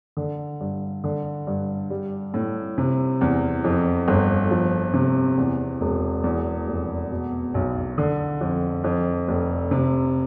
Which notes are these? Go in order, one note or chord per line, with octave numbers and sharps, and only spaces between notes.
D3
G2
D3
G2
G3
A2
C3
E2
F2
G1
F3
C3
E2
E1
E2
F1
B2
B1
D3
F2
F2
F1
C3